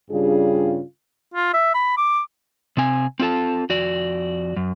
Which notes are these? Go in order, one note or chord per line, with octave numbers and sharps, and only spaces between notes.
G2 C#3 G3 D4 F4 G#4
F4
E5
B5
D6
C3 C4 G#5
C4 F4 A4 A5
F2 F#4 D5
F#2